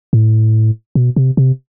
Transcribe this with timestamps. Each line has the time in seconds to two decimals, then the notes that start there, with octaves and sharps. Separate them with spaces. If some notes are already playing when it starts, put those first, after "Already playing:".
0.13 A2
0.95 B2
1.16 C3
1.37 C3